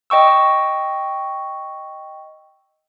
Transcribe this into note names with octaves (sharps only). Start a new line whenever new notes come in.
D#5 G5 C#6 E6